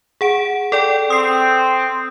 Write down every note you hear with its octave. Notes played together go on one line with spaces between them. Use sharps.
G#4 F#5 D7
A4 D5 G5
C4 D#6 C7